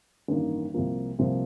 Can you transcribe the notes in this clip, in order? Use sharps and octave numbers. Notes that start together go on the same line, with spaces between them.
A1 G2 D#3 A#3 D#4
C2 C3 F3 A#3 F4
C2 C3 F3 A#3 F4